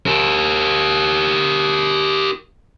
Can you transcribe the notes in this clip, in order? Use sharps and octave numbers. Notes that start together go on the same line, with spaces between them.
G4 A#4